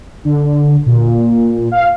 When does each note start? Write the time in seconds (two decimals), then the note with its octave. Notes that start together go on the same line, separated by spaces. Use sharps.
0.25 D3
0.86 A#2
1.72 F5